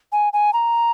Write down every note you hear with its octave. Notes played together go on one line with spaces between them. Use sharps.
G#5
G#5
A#5